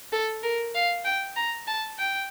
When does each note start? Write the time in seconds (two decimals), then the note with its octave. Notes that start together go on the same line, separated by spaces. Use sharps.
0.12 A4
0.43 A#4
0.75 F5
1.05 G5
1.36 A#5
1.68 A5
1.99 G5